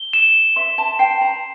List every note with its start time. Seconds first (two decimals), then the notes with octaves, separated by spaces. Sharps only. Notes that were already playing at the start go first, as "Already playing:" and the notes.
Already playing: G7
0.13 E7
0.56 E5 C6
0.78 A5
0.99 G5 C7
1.21 A#5